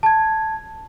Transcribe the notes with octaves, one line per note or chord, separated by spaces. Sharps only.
A5 G#6